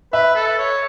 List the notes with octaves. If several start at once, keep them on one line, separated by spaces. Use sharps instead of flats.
B4 E5
A4
C#5